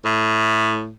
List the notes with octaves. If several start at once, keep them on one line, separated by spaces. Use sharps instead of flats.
A2